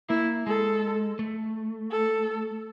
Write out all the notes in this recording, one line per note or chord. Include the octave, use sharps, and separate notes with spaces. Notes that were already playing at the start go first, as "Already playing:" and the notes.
A#3 E4
G#3 A4
A3
A4